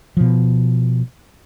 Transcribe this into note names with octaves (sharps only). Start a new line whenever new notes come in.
B2 F3